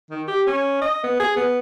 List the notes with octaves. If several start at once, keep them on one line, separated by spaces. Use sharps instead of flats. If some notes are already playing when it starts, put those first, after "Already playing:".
D#3
G4
C#4
D#5
B3
G#4
B3